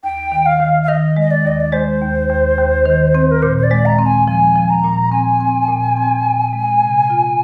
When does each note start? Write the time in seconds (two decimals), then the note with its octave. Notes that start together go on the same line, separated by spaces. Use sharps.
0.03 D#2 G5
0.32 D#3
0.46 F5
0.60 D#3
0.83 F5
0.88 D#3 D#5
1.16 G#3 D#5
1.31 D5
1.45 D#2 D#5
1.60 D5
1.73 G#3 C5
2.01 D#2
2.29 D#2
2.58 D#2
2.86 D#3
3.15 C4
3.31 A#4
3.42 A#2 C5
3.57 C5
3.63 D5
3.71 G#3
3.85 A#5
3.99 C4
4.06 G#5
4.28 F3 G#5
4.55 F3
4.70 A#5
4.84 A#2
5.12 C4 G#5
5.40 C4
5.68 A#2
5.97 C4
6.25 A#2
6.53 G#3
6.81 C3
7.10 F4